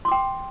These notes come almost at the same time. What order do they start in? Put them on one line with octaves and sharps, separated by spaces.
C6 D6 G5